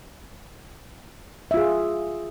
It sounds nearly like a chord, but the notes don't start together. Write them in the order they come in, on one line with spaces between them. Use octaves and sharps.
E5 F4 G#4